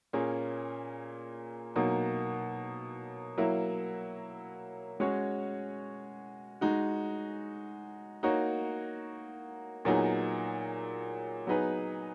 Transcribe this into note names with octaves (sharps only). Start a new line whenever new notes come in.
A#2 A#3 C#4 G#4
B2 F#3 A#3 D#4
F#3 A#3 E4
G#3 C#4 F#4 C#5
G#3 D#4 F#4
A#3 D#4 F#4 C#5
A#2 F#3 B3 D#4 G#4
F#3 B3 D#4 G#4 B4